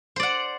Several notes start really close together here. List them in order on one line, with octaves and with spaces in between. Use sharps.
C5 D5 F#5